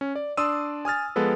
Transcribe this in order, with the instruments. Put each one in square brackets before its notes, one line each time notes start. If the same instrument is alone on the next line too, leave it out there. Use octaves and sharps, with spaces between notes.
[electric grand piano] C#4
D5
D4 D5 C6 D#6 E6 D#7
G#5 D#6 F6 A6
F3 G#3 B3 A4 B4